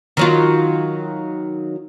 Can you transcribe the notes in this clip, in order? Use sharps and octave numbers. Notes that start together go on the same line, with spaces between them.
D#3 F#3 F4